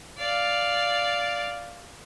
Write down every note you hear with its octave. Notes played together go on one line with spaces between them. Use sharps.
D5 F5